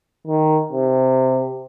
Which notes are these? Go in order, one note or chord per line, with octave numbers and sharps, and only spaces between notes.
D#3
C3